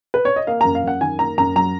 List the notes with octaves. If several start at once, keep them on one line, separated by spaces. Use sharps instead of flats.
B4
C#5
D#5
A#3 F5
F#2 A#5
F5
F#2 F#5
D#3 G#5
A#3 A#5
F#2 A#5
F#3 A#5